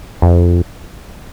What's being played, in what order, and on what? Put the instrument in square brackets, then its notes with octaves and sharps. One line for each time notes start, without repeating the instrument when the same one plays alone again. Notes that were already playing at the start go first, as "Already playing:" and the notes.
[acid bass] F2